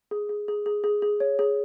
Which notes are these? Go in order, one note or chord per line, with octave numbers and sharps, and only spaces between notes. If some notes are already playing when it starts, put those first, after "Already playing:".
G#4
G#4
G#4
G#4
G#4
G#4
C#5
G#4